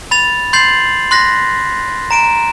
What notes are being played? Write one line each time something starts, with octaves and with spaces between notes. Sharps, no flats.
B5 A6 F7
C6 G6 A6 C7 F#7
C6 F#6 A#6 B6
A#5 D7 E7